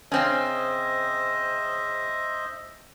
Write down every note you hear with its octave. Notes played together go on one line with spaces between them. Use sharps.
C#3 C4 C#4 C5 D#5 E5